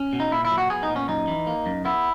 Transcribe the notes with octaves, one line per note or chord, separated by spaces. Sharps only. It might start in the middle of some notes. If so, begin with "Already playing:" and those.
Already playing: C#4
B2
D#4
A#2 E4
E4
F#3
F#4
B3 G#4
D#4
A#2
C#4
F#2 D#4
E3
A#3
F#2
B3 E4